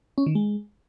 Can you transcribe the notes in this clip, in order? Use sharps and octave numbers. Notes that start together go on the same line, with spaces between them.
C#4
D#3
G#3